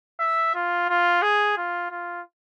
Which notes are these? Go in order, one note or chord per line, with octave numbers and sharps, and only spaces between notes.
E5
F4
F4
G#4
F4
F4